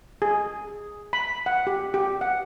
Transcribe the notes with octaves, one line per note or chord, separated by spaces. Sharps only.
G#4
B5
F#5
G4
G4
F#5